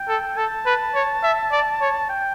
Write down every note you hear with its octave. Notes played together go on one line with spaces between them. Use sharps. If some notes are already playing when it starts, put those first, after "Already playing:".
Already playing: G5
A4
A4 A5
B4
C#5
E5
D5
C#5
G5